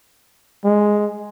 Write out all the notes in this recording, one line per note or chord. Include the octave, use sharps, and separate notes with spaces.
G#3